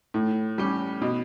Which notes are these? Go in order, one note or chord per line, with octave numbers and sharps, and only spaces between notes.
A2
G3 C#4 G4
B2